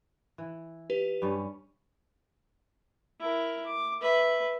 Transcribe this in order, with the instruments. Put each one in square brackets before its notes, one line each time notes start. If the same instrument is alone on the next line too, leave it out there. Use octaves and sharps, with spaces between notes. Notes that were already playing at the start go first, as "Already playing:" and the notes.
[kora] E3
[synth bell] G4 B4
[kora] G2 G3 C#4
[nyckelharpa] E4 A#4
D6
B4 E5